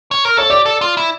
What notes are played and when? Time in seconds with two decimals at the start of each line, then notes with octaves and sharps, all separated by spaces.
0.11 C#5
0.25 A#4
0.37 A4 C#5
0.50 G4 D5
0.66 A4
0.81 F4
0.97 E4